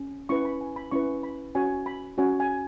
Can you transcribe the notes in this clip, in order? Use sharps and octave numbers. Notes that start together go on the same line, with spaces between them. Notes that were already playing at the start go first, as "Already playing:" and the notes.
Already playing: C#4
C#4 E4 B4 C#6
B5
G#5
B5
C#4 E4 B4 C#6
B5
C#4 F#4 C#5 G#5
B5
C#4 F#4 C#5 G#5
G#5